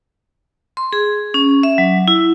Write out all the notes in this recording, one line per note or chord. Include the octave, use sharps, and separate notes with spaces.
C6
G#4
C#4
E5
F#3
E4